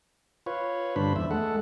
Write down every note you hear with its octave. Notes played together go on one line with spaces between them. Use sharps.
F4 B4 C#5
G2 D3 D4 C5 B5
E2 E5
G#3 A3 A4 F#5